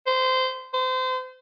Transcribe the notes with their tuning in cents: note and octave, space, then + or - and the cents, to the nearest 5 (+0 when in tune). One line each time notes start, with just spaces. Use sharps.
C5 -20
C5 -30